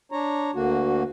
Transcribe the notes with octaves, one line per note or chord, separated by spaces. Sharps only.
D4 C#5 A#5
D2 D3 A#3 F#4